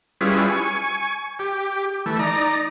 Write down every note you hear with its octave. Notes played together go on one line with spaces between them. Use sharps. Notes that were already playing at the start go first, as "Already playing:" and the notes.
G3 C#4 E4 F4 G#4 B4
G#5 C#6
G4
E3 A3
D#4 D5 A#5